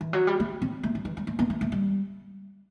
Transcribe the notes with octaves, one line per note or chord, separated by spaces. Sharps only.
E3
F#3
G3
A3
C4
A3
G3
E3
G3
A3
B3
A3
A3
G3